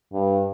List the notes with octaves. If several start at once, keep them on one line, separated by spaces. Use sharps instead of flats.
G2